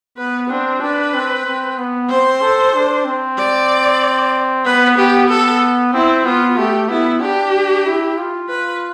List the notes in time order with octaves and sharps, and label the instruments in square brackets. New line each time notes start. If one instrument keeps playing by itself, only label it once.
[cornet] B3 [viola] B4
[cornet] C4 [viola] D4
[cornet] D4 [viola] B4
[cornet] C4
C4
B3
[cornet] C4 [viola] C5
[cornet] A4
D4
C4
[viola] D5
[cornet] B3 [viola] B4
[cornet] B3 [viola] G4
[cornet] B3 [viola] A4
[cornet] C4 [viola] E4
[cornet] B3 [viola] F4
[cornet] A3 [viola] G4
[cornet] B3 [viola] E4
[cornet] D4 [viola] G4
[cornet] E4
F4
[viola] B4